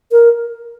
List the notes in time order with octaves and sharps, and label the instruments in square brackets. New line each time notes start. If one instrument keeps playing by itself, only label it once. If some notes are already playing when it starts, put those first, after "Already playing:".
[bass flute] A#4